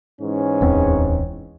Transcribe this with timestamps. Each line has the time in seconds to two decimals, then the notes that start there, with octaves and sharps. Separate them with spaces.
0.22 G#2 E3 C#4
0.61 D1 E2 C4